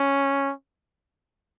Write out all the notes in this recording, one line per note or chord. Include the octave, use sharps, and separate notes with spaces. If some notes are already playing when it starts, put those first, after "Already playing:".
Already playing: C#4